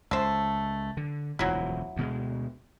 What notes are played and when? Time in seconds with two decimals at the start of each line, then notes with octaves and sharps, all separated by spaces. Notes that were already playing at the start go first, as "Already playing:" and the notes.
0.11 C#2 A3 C5
0.97 D3
1.39 E1 D2 F3 F#3 E4
1.96 D2 B2 G#3